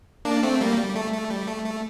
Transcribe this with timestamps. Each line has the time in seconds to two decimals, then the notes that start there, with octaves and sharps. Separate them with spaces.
0.25 A#3 D4
0.43 A3 C4
0.61 G3 A#3
0.78 G3
0.95 A3
1.13 A3
1.30 G3
1.47 A3
1.65 A3